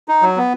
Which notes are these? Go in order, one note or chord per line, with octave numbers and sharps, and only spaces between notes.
D#4
F#3
B3